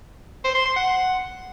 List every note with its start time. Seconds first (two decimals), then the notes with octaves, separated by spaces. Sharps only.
0.45 C5
0.55 C6
0.66 C6
0.76 F#5